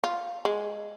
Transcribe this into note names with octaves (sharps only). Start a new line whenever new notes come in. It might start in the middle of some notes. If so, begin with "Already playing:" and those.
F4
G#3